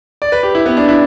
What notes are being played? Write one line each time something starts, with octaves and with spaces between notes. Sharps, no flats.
D5
B4
G4
E4
B3
D4
E4